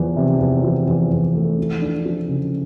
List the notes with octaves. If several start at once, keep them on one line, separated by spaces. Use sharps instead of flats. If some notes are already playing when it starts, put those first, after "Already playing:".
Already playing: E2 F3
C3
E2
F3
E2
E2
A3
F3
D4
F3
C#3